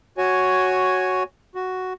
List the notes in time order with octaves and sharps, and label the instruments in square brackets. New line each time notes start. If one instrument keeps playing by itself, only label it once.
[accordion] F#4 C#5 G#5
F#4